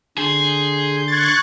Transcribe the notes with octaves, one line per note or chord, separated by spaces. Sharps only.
D3 G#4 C6 G6
C#6 F#6 G#6 A6